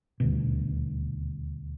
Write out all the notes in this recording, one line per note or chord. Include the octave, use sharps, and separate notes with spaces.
D#1 D2 B2